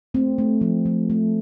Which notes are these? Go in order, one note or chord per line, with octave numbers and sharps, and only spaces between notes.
A3 C4
A3
F3
F3
A3